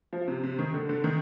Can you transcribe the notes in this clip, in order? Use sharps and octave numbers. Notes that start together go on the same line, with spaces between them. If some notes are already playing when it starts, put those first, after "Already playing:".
F3
C3
C3
D#3
D3
D3
D#3